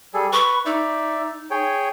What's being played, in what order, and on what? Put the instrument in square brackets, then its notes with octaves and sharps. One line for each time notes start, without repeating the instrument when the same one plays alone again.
[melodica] G3 G#4 A4
[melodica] B4 [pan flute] C#6
[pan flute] D#4 [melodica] D5 E5
[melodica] G#4 C#5 G5